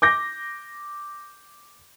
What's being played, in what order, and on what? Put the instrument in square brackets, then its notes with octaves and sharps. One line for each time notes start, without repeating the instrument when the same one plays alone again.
[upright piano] D6 G6 A#6